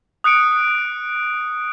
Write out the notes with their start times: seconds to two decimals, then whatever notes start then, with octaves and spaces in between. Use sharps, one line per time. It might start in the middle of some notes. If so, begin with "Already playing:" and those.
0.24 D#6 F#6 C#7 D7